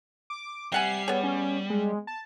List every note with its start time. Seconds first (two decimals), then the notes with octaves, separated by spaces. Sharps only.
0.30 D6
0.72 C3 G3 F#5 G#5 C7
1.08 B3 G#4 C#5
1.24 C#4
1.70 G#3
2.07 A5